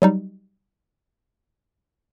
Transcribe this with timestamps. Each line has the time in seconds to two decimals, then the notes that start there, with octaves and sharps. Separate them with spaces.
0.02 F#3 G3 D#4